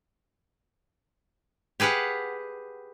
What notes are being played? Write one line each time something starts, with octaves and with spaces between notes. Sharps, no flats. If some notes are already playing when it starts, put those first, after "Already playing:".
G4 G#4 B4 F5 F#5